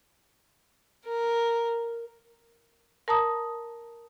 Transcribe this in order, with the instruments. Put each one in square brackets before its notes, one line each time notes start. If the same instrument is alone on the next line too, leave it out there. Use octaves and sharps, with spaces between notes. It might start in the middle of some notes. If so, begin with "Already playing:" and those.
[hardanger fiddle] A#4
[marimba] A#4 A5 A#5 D#6